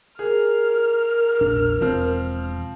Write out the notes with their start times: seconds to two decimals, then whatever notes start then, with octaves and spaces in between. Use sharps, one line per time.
0.19 G#4 A#4 F6
1.41 E1 A#1 D4
1.81 E1 F3 C4